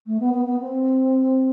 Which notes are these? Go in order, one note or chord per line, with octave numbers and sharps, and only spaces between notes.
A3
B3
B3
B3
C4